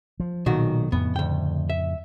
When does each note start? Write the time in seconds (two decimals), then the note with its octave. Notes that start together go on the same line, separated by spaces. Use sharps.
0.20 F3
0.46 B1 A#2 D#3 F#4
0.92 F2 A2 C#3 B3
1.16 D2 G5
1.70 E5